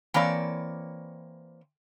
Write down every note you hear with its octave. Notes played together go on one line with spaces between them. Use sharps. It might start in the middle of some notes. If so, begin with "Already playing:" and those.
E3 A#3 C4 C#5 D5